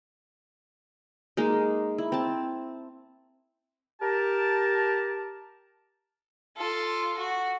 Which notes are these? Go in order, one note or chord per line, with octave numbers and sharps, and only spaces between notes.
G#3 A#3 D#4
E4
C4 A5
G4 A#4 A5
F4 A4
F#4